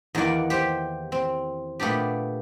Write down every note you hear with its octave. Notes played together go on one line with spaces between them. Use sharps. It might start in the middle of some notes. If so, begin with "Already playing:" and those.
E2 D#3 A#3 D5 F#5
G4 C5
C4
A#2 A3 B3 D4 G4